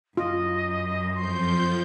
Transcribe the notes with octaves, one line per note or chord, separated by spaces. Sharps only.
F#2 F4 D#5
F2 F3 C6 G6